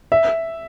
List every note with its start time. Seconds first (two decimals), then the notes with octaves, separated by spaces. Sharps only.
0.12 E5